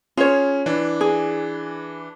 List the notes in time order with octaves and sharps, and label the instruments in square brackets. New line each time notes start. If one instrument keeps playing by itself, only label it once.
[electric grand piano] C#4 G#4 [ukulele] F4 C#5
[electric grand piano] E3 D4
[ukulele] G#4